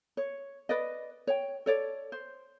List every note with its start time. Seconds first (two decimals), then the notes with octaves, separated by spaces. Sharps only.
0.17 C#5
0.69 B4 D5 D#5
1.27 C#5 G5
1.66 A4 C#5 D5
2.12 C5